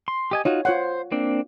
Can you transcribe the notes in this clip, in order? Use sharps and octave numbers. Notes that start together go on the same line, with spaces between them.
C6
G4 D#5 G#5
D#4 F4 F#4 C#5
F4 C5 C#5 F#5
A#3 C4 D4